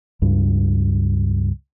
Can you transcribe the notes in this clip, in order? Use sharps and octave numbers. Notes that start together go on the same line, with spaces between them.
C#2 G2